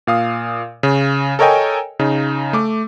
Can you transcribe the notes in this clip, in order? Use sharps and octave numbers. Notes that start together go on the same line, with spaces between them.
A#2 F5 D#6
C#3
A4 A#4 C#5 D#5 G5 G#5
C#3 D#4
A3 D6